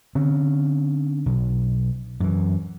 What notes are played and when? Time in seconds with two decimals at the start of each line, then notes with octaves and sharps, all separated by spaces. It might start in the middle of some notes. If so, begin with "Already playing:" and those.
0.15 D3 C4 C#4
1.26 B1
2.20 F#2 E3